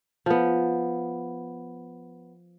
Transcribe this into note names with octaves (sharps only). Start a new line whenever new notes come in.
F3 B3